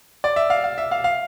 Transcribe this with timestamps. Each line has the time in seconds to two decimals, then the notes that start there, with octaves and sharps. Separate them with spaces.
0.24 D5
0.36 E5
0.50 F5
0.64 F5
0.78 E5
0.91 F5
1.04 F5